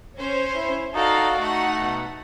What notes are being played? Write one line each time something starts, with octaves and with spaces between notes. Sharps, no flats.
C#4 C5 C#5
E4
D#4 F#4 A4 D5 F5
A3 D#4 F#5
B2